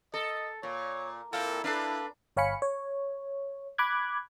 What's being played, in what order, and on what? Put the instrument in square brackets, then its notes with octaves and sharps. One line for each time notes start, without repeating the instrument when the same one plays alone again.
[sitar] A4 [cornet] D#5
[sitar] A#2 [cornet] C#5
[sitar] A#2 [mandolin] A#3 C4 [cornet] E4 [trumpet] A4
[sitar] D4 [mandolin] A4 F5 [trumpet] B4
[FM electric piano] G1 C#5 F5 G#5 B5 C#7
C#5
B5 D6 F#6 G#6